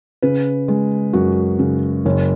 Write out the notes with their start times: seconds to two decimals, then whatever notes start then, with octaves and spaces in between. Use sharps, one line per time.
0.22 C#3 B4
0.68 G#3
1.13 F#2 F#4
1.59 C#3
2.05 F#1 C#5